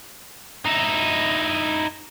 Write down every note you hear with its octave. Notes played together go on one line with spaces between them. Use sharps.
D#4 E4